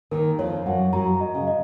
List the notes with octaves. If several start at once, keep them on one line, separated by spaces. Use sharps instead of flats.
D#2 D#3 A#4
F2 F3 C#5
F#2 F#3 F#5
F#2 F#3 A#5
D#5
C#3
D#5